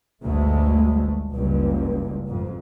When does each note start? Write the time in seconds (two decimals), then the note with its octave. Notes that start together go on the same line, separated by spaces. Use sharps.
0.22 G1 D2 G#3 A3
1.34 F#1 C#2 G2
2.28 F2 G#2